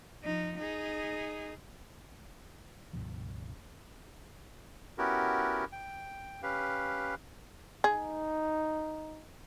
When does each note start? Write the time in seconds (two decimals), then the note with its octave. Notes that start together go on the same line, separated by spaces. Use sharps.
0.24 F3 D#4
0.59 D#4 G#4
2.93 C#2 G2 B2 F3
4.98 B3 C#4 E4 F#4 G4 A#4
5.72 G5
6.43 C#4 G4 B4 F5
7.84 D#4 G#4